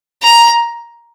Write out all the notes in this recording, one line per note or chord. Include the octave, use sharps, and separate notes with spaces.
A#5